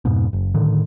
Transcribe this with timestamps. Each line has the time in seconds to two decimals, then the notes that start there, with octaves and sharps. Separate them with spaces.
0.05 F2 G#2 B2
0.33 F#1
0.54 A2 D3 D#3